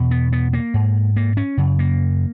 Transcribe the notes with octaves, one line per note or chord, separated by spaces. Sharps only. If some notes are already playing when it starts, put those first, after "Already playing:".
Already playing: E2 B2
B3
B3
A#3
G#2
A#3
C#4
F#2 C#3
A#3